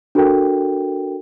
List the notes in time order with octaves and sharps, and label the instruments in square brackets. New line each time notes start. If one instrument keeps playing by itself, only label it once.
[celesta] D4 F#4 A4 A#4 G5